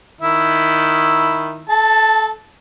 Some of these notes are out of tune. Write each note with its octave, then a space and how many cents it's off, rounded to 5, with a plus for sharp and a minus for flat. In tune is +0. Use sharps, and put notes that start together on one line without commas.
D#3 +0 E4 +0
A4 -25 A5 +5